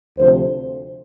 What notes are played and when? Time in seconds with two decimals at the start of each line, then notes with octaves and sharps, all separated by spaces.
0.18 D2 C3 F3 C5